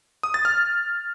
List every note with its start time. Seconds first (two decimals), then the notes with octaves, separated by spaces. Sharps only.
0.23 D#6
0.34 A6
0.45 F6